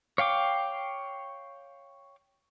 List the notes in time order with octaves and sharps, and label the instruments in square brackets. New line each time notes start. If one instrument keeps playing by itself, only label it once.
[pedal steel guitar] C#5 F5 G5 D6